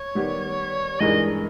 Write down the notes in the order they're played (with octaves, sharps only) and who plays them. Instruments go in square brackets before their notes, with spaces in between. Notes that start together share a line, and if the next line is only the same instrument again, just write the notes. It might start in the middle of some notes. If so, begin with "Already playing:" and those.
Already playing: [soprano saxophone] C#5
[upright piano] D#3 G3 B3 G4
[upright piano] G2 E3 G#3 D#4 A#4 [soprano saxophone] D#5